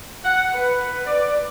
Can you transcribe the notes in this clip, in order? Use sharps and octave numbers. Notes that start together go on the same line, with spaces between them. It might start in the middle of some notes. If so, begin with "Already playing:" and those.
F#5
B4
D5